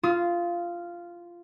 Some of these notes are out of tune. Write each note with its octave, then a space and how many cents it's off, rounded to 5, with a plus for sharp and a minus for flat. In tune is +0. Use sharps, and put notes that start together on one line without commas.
F4 -10 D#6 +35